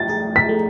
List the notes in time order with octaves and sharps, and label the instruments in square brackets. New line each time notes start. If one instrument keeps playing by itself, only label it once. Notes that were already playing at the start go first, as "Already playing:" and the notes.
Already playing: [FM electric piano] A3 [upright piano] A6
[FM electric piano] G#4
[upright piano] B6
[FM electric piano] A3